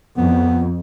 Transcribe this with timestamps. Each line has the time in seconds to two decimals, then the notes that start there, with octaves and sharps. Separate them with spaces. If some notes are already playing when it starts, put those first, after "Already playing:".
0.17 F2 B3